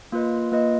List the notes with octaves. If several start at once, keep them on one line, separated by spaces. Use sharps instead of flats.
A#3 F4 B4 D#5
A#3 F4 B4 D#5